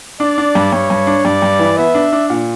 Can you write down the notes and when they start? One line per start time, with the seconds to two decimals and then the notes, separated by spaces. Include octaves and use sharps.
0.20 D4 D5
0.38 D4
0.55 G2
0.72 G2 C#5
0.90 G2
1.07 D4
1.25 G2 D5
1.42 G2
1.59 E3
1.77 B3 E5
1.95 D4
2.13 D4
2.30 A#2